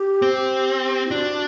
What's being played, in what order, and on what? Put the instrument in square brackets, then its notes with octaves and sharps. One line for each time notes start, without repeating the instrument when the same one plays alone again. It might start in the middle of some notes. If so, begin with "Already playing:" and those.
Already playing: [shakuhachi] G4
[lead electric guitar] C4
[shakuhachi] E4
[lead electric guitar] D4 [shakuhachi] F#4